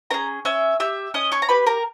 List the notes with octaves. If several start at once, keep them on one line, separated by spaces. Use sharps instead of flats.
C#4 G#4 A#4 A#5
C#4 E5 E6
G4 E5 E6
C#4 D#5 D#6
C#5 C#6
A#5
G4 B4 B5
A#4 A#5